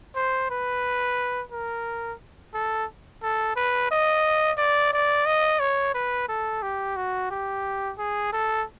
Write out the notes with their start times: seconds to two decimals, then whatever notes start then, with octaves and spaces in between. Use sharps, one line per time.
0.16 C5
0.51 B4
1.52 A#4
2.54 A4
3.23 A4
3.56 B4
3.91 D#5
4.58 D5
4.93 D5
5.26 D#5
5.60 C#5
5.94 B4
6.29 A4
6.63 G4
6.96 F#4
7.31 G4
7.99 G#4
8.33 A4